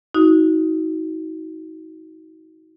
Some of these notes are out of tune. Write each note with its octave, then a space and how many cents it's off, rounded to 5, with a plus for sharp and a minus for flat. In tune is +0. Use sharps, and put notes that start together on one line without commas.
D#4 +35 F#4 +0